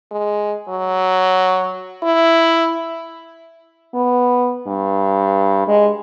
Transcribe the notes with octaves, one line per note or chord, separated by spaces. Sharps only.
G#3
F#3
E4
B3
G2
G#3